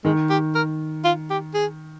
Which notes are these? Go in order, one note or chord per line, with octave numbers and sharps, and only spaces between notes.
D#3 G#3
G4
A#4
F4
G4
G#4